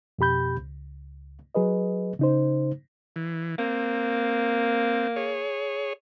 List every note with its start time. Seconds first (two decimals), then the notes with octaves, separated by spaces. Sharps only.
0.19 F2 B2 G4 B5 G6
0.58 C#2
1.55 F#3 G#4 B4 D#5
2.19 C#3 D#4 C5
3.16 E3
3.59 A#3 C4
5.16 G#4 C#5